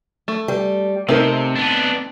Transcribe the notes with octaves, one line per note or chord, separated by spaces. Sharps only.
A3
G3
C3 A3 C4 D#4 A#4
B3 D4